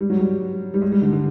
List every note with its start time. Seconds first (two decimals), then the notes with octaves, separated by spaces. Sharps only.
0.01 G3
0.10 F#3
0.19 G3
0.74 G3
0.82 G#3
0.92 G3
1.02 D3
1.13 D3